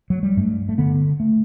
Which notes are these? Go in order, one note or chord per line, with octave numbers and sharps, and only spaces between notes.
F#3
G3
G2 A3
A3
D3 B3
A3